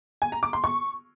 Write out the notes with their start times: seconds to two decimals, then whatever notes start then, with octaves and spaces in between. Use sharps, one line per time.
0.22 G#5
0.32 A#5
0.43 D6
0.53 C6
0.64 C#6